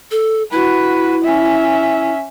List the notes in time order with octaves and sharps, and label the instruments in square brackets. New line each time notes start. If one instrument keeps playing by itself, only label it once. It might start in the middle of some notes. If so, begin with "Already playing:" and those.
[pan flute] A4
[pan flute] E4 [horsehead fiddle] F#4 B4
[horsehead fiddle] C#4 E5